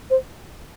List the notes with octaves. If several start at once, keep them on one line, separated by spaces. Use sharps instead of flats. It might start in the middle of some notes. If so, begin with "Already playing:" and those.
C5